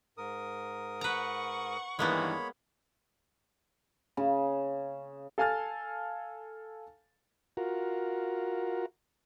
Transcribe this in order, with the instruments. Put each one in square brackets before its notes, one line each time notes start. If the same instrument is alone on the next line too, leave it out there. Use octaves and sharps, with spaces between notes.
[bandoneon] G#2 A#4 D#6
[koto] B4 A#5 [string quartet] F#5 C#6
[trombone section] G2 D#3 E3 [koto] G#3 A#3 B3 [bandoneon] C#5 B5
[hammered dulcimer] C#3
[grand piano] A4 F5 G#5 A5 F6 A6
[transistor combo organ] F4 F#4 A#4